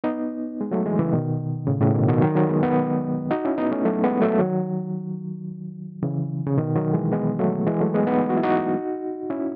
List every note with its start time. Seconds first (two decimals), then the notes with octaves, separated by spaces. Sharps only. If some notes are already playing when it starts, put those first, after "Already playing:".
0.04 B3 D#4
0.61 G#3
0.71 F#3 A3
0.86 E3 G#3
0.99 C#3 E3
1.13 B2 D#3
1.67 A2 C#3
1.81 A2 C#3
1.95 B2 D#3
2.08 B2 D#3
2.21 D#3 F#3
2.35 D#3 F#3
2.49 G#3 B3
2.63 B3 D#4
3.31 D#4 F#4
3.45 C#4 E4
3.58 B3 D#4
3.71 A3 C#4
3.85 F#3 A3
4.03 G#3 B3
4.21 F#3 A3
4.39 D#3 F#3
6.03 C#3 E3
6.46 C#3
6.57 B2 D#3
6.76 D#3 F#3
6.93 E3 G#3
7.12 G#3 B3
7.39 F#3 A3
7.67 E3 G#3
7.80 F#3 A3
7.94 G#3 B3
8.07 B3 D#4
8.29 F#4
8.37 E4
8.43 D#4 F#4
9.30 C#4 E4